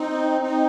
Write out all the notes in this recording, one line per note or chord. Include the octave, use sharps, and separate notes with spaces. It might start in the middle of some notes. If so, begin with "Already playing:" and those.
Already playing: C4 D#4
C4 D#4